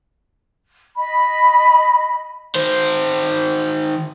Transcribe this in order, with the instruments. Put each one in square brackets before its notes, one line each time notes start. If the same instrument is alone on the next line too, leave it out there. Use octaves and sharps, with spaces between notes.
[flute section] D#5 B5
[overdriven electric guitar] D#3 C5